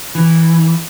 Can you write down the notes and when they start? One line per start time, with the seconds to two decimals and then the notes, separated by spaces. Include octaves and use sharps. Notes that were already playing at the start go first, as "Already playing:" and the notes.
0.15 E3